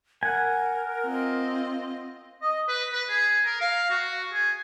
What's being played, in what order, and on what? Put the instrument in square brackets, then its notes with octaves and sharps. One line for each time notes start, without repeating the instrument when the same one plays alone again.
[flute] A#4 [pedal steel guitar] F#5 G#5
[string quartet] C4 F4 D#5
[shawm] D#5
B4
B4
G#4
A#4
F5
F#4
G#4